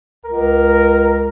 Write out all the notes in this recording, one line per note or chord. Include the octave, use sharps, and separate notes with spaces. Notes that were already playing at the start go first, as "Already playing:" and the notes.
C#2 A#4